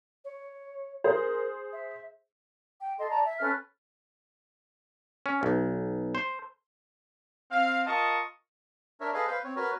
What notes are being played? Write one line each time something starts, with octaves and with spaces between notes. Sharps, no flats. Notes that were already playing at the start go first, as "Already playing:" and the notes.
C#5
G#4 A#4 C5
E5
G5
A4 D#5 C6
D5 A5 A#5
E5
C#4 A4 B4 F6
C#4
B1
C5
C4 F5
F4 A#4 D#5 A5 C#6 D#6
D4 A#4 C#5 E5
G#4 A4 B4 D#5 F5
B4 C5 F5
C4 C#5
F#4 A#4 B4 C#5